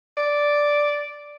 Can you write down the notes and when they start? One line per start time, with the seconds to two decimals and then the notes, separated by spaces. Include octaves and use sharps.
0.17 D5